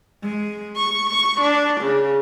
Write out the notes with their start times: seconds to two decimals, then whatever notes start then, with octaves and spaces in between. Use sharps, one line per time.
0.22 G#3
0.76 C#6
1.12 C#6
1.41 D4
1.82 C#3